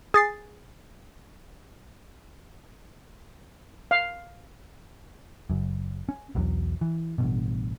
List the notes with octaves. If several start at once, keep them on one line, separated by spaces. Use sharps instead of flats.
G#4 A6 C7
F5
F#1 F#2
C#4
B1 E2 F#3
E3
A1 G2 B2